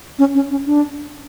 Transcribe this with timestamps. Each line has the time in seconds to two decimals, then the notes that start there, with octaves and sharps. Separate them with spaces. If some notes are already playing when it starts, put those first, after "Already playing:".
0.19 C#4
0.35 C#4
0.50 C#4
0.66 D4